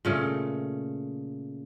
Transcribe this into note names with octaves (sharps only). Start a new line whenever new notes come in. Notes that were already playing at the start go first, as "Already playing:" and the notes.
A#2 C#3 A3